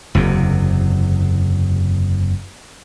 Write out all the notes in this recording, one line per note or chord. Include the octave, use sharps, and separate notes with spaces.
F#1 E2 C3